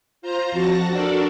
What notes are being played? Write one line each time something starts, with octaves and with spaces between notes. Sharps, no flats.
F4 C5 A#5
F2 F#4 A5 A#6
D4 F#4 A4 A#4 D5